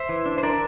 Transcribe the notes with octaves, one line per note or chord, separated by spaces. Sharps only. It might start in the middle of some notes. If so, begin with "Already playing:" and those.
Already playing: C5 E5
E3
D4
C5
D4 A#4 D5